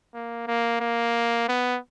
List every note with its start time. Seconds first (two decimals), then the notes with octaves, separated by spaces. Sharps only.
0.14 A#3
0.47 A#3
0.81 A#3
1.48 B3